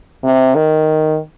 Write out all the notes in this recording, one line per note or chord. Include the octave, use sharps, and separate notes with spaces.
C3
D#3